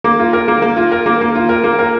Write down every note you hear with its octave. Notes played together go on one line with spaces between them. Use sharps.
A#3
F4
A#4
A#3
A#3
F4
A#4
A#3
A#3
F4
A#4
A#3
A#4